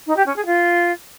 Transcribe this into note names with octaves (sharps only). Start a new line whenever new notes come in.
D#4
G4
C#4
G#4
F4